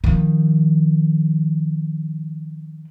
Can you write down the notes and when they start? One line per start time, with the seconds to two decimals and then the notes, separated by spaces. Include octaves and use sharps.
0.04 D#3 F3